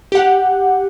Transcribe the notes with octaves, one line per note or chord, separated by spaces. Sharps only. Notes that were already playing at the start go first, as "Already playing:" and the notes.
G4 F#5